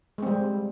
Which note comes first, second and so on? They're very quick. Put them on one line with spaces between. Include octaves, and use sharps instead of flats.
G#3 C4 G3